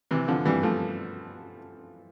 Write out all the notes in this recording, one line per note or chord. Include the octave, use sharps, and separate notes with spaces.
C3 E3
D3 F3
E3 G3
F3 A3